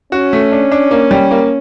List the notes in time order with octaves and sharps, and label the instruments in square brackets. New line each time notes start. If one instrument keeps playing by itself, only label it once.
[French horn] C#4 [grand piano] F#4
[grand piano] A3
D4
D4
A#3
G3
A#3